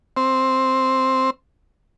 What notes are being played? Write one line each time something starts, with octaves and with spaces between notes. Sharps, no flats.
C4